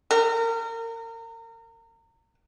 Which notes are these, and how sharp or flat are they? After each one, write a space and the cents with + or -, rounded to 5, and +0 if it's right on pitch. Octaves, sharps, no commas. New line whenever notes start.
A#4 -30